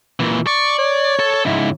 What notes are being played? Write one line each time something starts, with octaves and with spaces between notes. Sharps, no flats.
A#2 E3
D5 C#6
C#5
A4 A5
C#2 G#2 E4